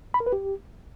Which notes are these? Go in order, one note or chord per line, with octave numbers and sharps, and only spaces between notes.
B5
A#4
B4
G4